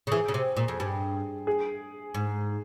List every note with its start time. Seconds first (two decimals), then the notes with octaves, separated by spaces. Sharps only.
0.07 C#3
0.12 E3 G#4
0.28 C#3
0.34 C3
0.57 A#2
0.68 F2
0.80 G2
1.47 G#4
2.14 G#2